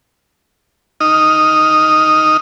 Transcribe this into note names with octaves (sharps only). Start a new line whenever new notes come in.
D#4 D#6 F6